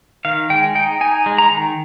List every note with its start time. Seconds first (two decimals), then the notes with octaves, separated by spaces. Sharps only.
0.25 D#3 F5
0.50 G#3 G5
0.75 D#4 G5
1.01 D#4 G#5
1.26 G#3
1.38 A#5
1.51 D#3